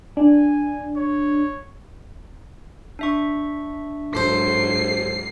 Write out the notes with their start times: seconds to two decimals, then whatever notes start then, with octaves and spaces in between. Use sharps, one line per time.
0.17 D4 G#5
0.96 C#5
2.99 D4 E5 C#6
4.15 G#2 F#3 A4 C5 C7